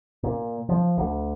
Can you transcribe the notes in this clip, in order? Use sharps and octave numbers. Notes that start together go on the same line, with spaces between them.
A#2
F3
D2